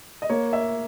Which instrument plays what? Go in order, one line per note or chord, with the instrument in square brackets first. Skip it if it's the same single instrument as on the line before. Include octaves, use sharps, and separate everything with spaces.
[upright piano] D#5
A#3 C#5
E5